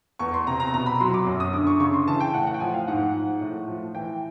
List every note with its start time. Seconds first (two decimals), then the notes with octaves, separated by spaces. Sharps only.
0.19 E2 C#6
0.34 C6
0.47 C3 A#5
0.60 A#5
0.74 B2 A#5
0.86 B5
1.00 F#3 C6
1.14 D6
1.26 F#2
1.40 D#6
1.53 D3 D6
1.67 C#6
1.80 C#3 C#6
1.93 C6
2.07 E3 A5
2.20 G5
2.34 A2 F#5
2.47 F#5
2.54 G5
2.60 F3 G#5
2.74 F5
2.88 G#2 F#5
3.14 F3
3.41 A2
3.68 F3
3.95 E3 G5